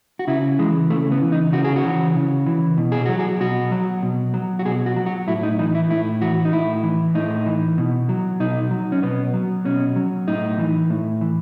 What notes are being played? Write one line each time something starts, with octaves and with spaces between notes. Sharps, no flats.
F#4
C#3 E4
E3 G#3
C#3 A3
B3
E3
D#4
C#3 F#4
G#4
F#4
E3
C#3
E3
B2
G#4
F#3 F#4
G#4
B2 F#4
F#3
B2
F#3
F#4
B2 G#4
F#4
F#3
F#4
A2 E4
D#4
E3 D#4
E4
A2 E4
E3 F#4
D#4
A2 E4
E3
A2 D#4
E3
B2
F#3
B2 D#4
F#3
C#4
B2 B3
F#3
B2 C#4
F#3
A2 D#4
E3
A2
E3